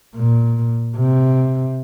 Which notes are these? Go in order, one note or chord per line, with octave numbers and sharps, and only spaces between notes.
A#2
C3